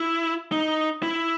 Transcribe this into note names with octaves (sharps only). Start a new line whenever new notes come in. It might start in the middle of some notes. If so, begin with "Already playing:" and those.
Already playing: E4
D#4
E4